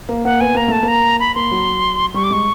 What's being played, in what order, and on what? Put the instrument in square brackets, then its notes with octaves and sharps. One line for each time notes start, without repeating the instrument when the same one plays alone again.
[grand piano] A#3
[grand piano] A#3 [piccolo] F#5
[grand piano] B3 [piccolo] G#5
[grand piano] A#3 [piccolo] A#5
[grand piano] A3 [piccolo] A5
[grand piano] A#3
[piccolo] A#5
B5
[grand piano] A#3 [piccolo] C6
[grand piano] F#3
[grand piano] G3 [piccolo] C#6
[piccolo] D6
[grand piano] G#3 [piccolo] C#6